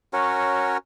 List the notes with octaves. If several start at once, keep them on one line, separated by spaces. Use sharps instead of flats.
C#4 F#4 A#4 C#5